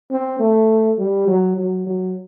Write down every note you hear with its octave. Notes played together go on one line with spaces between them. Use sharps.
C4
A3
G3
F#3
F#3
F#3